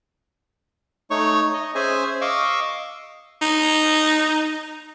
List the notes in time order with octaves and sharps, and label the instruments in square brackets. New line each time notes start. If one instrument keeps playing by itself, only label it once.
[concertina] A3 D#4 C#5 C#6
D#5
C#4 G#4 C5 E5 G#5
D#5 F5 C#6 D6 E6
[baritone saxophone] D#4